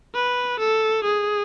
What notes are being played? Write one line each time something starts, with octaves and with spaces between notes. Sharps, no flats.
B4
A4
G#4